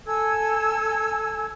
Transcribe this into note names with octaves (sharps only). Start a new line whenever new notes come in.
A4 G#5 E6 G#6